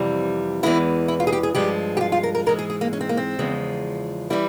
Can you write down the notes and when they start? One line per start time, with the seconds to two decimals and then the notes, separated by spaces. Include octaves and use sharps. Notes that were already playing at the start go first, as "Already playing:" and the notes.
Already playing: F2 C3 E3 G3
0.63 E2 E3 G#3 E4
1.08 E4
1.20 F4
1.27 G#4
1.32 G4
1.43 G#4
1.55 G2 F3 G#3 G4
1.97 G4
2.01 F4
2.12 F4
2.23 A#4
2.35 A#4
2.46 G#2 E3 G#3 A#4
2.59 G#4
2.70 G#4
2.81 A#3
2.93 C#4
3.01 C4
3.09 A#3
3.17 C4
3.39 E2 C#3 F3 G#3
4.30 E3 G3 E4